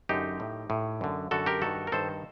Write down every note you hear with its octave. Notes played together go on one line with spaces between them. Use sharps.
F#2 D3 D#4 G4
A2
A2
F#2 D3
F#2 D3 F#4 A4
G4 A#4
G2 D#3 F#4 A4
A#4
G2 D#3 A4 C5